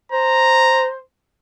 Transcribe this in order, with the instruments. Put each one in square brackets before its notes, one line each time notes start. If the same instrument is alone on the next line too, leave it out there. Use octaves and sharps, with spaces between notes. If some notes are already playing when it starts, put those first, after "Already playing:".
[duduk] C5 [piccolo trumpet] A#5